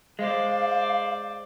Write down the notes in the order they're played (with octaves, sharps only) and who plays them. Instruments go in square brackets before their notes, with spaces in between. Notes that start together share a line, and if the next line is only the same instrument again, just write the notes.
[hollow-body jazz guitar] G#3 [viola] C5 D5 [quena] F5